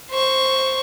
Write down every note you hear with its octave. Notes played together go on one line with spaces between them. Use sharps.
C5 C#6